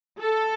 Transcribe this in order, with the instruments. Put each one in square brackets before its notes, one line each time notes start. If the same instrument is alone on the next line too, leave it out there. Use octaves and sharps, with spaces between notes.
[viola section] A4